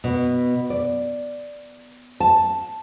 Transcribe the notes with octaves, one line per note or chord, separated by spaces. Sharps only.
B2
D5
A5